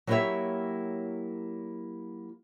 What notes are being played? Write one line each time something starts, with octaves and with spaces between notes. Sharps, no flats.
F#3 A#3 E4 G4 C#5 E5